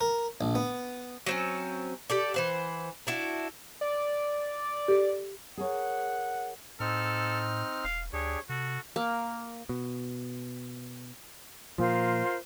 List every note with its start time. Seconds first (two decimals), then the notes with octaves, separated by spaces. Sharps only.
0.01 A#4
0.41 A#1
0.55 B3
1.26 F#3 C4 C#4
2.10 G4 A4 D5
2.34 E3 C5 F#5
3.07 D4 E4 F#4
3.81 D5
4.88 G4 A4
5.57 G#4 A#4 C#5 F#5
6.80 A2 C4 D#4 A4 F6
7.84 E1 F5
8.13 D2 D4 G4 G#4 C#5
8.49 C3 F#4 A4
8.96 A#3
9.69 B2
11.78 A#2 F3 F4 A#4 C5